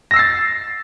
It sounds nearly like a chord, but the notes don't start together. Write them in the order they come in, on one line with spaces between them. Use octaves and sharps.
A#6 E6 C7 A6